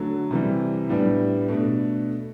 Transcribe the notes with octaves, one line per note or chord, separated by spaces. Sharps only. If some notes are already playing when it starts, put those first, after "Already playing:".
Already playing: D3 F#3 A3
C3 E3 G3
A2 G3 B3 D4
B2 A3 D4